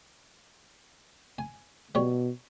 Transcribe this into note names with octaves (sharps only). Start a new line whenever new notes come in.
G#5
B2 G3 C#5